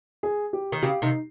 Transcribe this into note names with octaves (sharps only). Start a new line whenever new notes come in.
G#4
G4
D#3
C#3 G4
C3 D#3 D#4